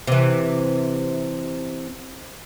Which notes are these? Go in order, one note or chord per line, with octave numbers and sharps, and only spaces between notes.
C3 E3